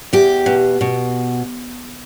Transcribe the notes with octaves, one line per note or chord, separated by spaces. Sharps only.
E2 G4
B2
B2